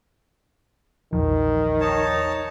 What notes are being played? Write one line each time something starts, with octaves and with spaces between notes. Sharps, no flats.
A#1 E2 D#3 F3
D#4 C#5 A5